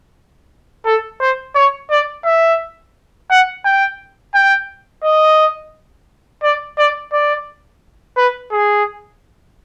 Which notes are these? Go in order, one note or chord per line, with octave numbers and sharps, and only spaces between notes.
A4
C5
C#5
D5
E5
F#5
G5
G5
D#5
D5
D5
D5
B4
G#4